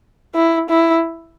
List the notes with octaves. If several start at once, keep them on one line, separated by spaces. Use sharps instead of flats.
E4
E4